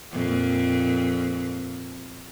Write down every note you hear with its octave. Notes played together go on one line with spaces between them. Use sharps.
F2 A#2